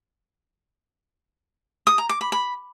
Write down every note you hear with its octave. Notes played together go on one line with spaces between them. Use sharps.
D#6
A#5
D6
B5
B5